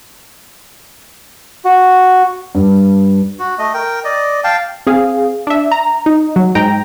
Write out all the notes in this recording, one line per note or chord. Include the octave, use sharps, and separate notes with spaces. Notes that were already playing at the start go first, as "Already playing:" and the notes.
F#4
G2
F#4
A3 D#5
A#4 G5
D5 D#5
F5 G5 A5
C4 G#4 F5
D4 E5
A#5
D#4
F#3
G#2 G5 A#5 A#6